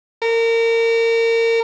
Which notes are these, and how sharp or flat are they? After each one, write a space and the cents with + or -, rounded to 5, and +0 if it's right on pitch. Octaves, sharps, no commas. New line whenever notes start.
A#4 -30